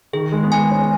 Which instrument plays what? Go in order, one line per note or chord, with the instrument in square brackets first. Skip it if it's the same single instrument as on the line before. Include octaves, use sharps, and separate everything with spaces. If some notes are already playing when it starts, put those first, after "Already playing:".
[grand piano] D#3 [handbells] G#4
[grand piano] G#3
B3
[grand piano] G#3 [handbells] G#5
[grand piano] C#4